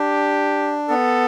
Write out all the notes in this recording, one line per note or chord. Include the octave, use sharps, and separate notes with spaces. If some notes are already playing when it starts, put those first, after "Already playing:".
Already playing: D4 G4
B3 A4